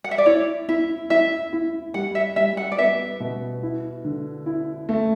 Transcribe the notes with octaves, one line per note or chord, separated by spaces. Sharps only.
F#5
E5
D5
E4 C#5
E4 E5
E4 E5
E4
G3 F#5
E5
G3 E5
F#5
D5
B3 E5
B2
E4
D3
E4
A3